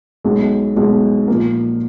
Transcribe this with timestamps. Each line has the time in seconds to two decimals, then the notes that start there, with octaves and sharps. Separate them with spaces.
0.24 B1 B2 G#3
0.76 B1 B2 G#3
1.28 A#2 F3 A#3